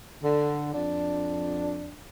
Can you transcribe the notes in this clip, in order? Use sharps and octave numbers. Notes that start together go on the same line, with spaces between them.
D3
F2 D4